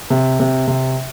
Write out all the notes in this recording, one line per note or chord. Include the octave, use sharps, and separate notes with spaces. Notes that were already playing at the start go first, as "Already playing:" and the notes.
C3
C3
C3